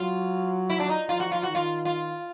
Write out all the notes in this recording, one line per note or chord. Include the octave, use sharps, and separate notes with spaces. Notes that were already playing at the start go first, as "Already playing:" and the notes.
Already playing: F#3 F4
E4
D4
D#4
F3 F4
F#4
F4
D#3 F#4
F4
F4